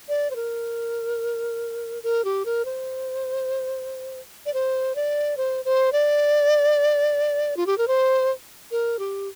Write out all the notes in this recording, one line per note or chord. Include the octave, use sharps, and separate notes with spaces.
D5
C5
A#4
A#4
G4
A#4
C5
D5
C5
D5
C5
C5
D5
F4
G4
A#4
C5
A#4
G4